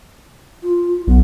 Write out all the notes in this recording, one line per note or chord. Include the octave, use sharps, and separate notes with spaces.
F4
B1 B3